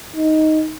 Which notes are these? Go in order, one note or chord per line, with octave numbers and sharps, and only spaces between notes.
D#4